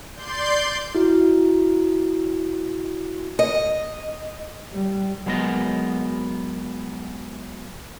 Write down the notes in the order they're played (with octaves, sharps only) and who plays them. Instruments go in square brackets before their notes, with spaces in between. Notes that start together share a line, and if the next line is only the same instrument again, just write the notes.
[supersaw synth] D5 C6 G6
[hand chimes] E4 F#4
[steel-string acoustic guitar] D#5
[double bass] G3
[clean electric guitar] F#3 G#3 B3 A#4 D#5